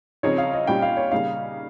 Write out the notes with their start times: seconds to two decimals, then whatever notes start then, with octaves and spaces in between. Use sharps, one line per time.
0.23 C#3 F3 C4 D#4 C#5
0.38 F5
0.53 D#5
0.67 A#2 G3 C#4 G4 G5
0.82 F5
0.97 C#5
1.12 C#3 G3 A#3 D#4 F5